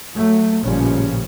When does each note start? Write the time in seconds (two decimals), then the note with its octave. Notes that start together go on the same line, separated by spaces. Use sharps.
0.14 F#3 A3
0.62 A1 A#2 C#3 F3 G3 C#4